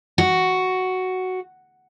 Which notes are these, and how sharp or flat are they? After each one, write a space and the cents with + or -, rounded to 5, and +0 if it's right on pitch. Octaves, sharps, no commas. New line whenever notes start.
F#4 +5